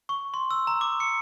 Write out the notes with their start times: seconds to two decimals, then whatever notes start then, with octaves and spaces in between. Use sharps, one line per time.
0.09 C#6
0.34 C6
0.51 E6
0.67 A#5
0.81 D6
1.00 C#7